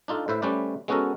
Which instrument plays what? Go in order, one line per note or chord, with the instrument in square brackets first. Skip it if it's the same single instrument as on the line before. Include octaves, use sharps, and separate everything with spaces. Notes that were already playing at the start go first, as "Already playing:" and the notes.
[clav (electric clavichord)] D4 D#4 F4 A4
A2 B4 C5 E5
G3 A3 C#4 B4 C5 D5
G#3 B3 C#4 F#4 A4 A#4